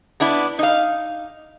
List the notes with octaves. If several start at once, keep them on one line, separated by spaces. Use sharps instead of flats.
B3 D4 E4
D#4 F5